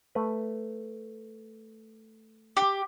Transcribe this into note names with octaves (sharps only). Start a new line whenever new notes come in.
A3 B4
G4